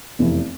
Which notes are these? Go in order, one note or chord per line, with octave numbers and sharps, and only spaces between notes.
F1 E2 E3